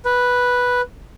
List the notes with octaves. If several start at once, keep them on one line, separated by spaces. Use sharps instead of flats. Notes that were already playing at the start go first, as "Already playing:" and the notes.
B4